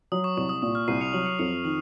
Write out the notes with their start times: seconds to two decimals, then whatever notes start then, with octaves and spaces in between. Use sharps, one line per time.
0.12 F#3 D#6
0.24 C#6
0.37 C2 C#6
0.49 D#6
0.62 A#2 D#6
0.75 F6
0.88 C2 C7 D#7
1.01 C#7 F7
1.13 F#3 D#7 F#7
1.26 C#7 F7
1.39 F2 C#7 F7
1.64 D#3 D#7 F#7